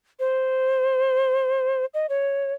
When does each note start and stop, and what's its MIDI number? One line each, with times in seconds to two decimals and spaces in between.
0.20 1.86 72
1.94 2.06 75
2.09 2.53 73